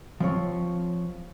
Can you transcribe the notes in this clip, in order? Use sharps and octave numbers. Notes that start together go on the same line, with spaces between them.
F3 C4 C#5